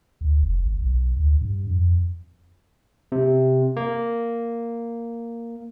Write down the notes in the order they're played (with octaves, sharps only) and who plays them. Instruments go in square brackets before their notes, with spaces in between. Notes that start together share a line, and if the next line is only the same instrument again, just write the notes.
[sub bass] D2
F1
G#1
B1
D2
G2
F2
[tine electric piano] C3
A#3